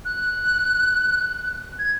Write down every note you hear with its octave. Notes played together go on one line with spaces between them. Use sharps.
F#6
G#6